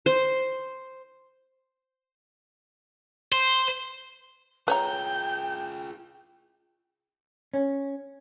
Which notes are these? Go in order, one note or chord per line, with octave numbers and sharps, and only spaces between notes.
C5
C5
F4 G#4 B4 C#5 G5 A#5 G6
C#4